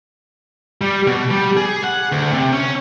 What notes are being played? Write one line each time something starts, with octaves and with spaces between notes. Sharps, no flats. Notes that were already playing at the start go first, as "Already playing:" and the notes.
G3
B2
G3
G#4
F#5
D2
C3
C#4